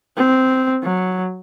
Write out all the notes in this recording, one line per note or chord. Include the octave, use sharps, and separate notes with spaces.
C4
F#3